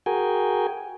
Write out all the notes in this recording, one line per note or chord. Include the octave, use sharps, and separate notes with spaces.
F#4 G#4 A#4 G5 G#5